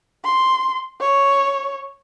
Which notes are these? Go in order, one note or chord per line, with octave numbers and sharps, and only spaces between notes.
C6
C#5